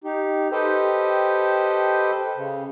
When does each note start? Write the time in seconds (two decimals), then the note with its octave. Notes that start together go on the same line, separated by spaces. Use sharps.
0.04 D#4 G4
0.52 G4 A4 B4 C5 D#5 G5
2.36 C#3